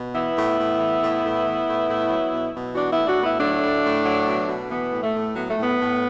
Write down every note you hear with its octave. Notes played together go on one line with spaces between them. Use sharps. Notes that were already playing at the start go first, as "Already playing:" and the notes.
Already playing: B2
E3 B3 E4
A2
A2
E3
A2
A2
E3
A2
A2
F#3
B2
B2
E3 D4 F#4
B3 E4
A2
D4 F#4
A2
B3 E4
F#3 A3 D4
A2
A2
F#3
B2
B2
E3 B3
A2
A3
A2
F#3 B3
A3
A2 B3
A2